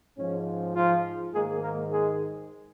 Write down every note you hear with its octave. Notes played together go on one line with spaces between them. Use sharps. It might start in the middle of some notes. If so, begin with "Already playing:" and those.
G#2 F3 G#3 C#4
F3 F4
G#2 D#3 G#3 A#3 G#4
A#3 A#4
G#3 G#4